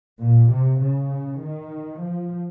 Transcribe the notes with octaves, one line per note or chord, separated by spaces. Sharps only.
A#2
C3
C#3
D#3
F3